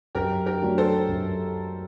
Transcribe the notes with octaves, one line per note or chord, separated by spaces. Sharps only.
F#2 G4 A#4
G4 A#4
F#3 A3 D4 F#4
A4 C5
F#2